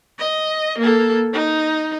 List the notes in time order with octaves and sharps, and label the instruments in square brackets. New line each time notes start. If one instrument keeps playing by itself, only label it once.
[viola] D#5
A#3 A4
D#4